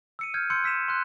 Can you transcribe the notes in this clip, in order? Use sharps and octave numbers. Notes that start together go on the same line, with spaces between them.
E6 C#7 D#7
F6 G6 G#6
C6 E6 F#6 G6 C#7
E6 B6 D#7 E7
C6 F#6